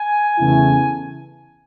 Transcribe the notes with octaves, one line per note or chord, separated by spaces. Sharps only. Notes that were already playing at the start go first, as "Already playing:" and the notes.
Already playing: G#5
E2 C#3 E3 A3 E4